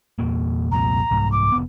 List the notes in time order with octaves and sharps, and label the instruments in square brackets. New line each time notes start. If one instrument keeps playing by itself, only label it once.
[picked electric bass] E2 A#2 A#3
[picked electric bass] C2 F2 A#2 [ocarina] A#5
[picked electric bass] C2 G#2
[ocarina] D6
[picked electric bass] F1 B3